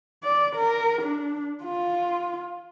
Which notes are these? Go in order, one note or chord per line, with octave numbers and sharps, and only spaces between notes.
D5
A#4
D4
F4